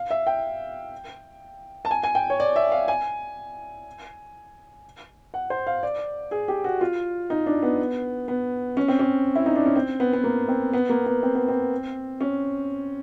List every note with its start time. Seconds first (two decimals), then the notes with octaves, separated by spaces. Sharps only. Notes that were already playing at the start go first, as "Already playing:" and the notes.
Already playing: F5
0.11 E5
0.27 G5
1.85 A5
1.91 G#5
2.04 G#5
2.15 G5
2.30 C#5
2.40 D5
2.56 E5
2.72 F5
2.88 G#5
5.34 F#5
5.50 C5
5.67 F5
5.83 D5
6.31 G#4
6.48 G4
6.64 F#4
6.81 F4
7.30 D#4
7.46 D4
7.63 B3
8.28 B3
8.77 C#4
8.88 C4
8.99 C#4
9.36 E4
9.46 D#4
9.56 D4
9.66 C#4
9.76 C4
10.00 B3
10.13 B3
10.24 A#3
10.48 C4
10.73 B3
10.89 A#3
11.06 B3
11.23 C4
11.35 B3
11.48 C4
12.21 C#4